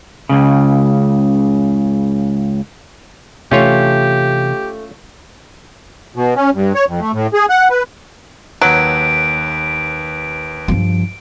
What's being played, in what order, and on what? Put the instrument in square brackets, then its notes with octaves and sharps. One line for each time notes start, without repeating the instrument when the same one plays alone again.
[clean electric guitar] C#2 C#3
[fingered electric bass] C3 E3 [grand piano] A3 [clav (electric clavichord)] C#4 F4 C#5 [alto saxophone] G4
[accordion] B2
C#4
G2
C#5
F2
A3
A2
G#4
F#5
B4
[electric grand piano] D#2 B4 [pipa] F#3 [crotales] D7
[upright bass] G2 F3